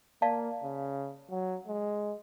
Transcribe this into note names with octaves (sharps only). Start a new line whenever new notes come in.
A#3 D5 F5 A5
C#3
F#3
G#3